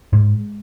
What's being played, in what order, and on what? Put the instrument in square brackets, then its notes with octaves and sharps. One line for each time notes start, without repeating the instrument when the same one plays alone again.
[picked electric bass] G#2 G#3